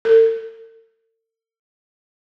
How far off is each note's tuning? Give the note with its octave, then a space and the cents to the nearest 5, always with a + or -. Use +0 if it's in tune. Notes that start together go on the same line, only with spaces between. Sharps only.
A4 +40